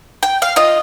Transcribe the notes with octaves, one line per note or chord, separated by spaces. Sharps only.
G5
F5
F4 D#5